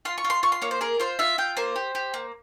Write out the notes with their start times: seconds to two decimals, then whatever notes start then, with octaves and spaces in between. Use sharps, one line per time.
0.05 F4 C6
0.18 C#6
0.24 F4
0.30 C6
0.43 F4 C#6
0.52 C6
0.62 A#3 C#5
0.71 C5
0.81 G#4 A#4
1.00 F4 C5
1.19 F4 E5
1.38 F4 G5
1.57 A#3 C5
1.76 G4
1.95 G4
2.14 A#3